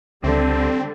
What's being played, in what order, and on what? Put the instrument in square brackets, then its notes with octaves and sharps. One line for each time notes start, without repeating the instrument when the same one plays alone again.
[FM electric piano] C#2 [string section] D3 G3 [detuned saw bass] C4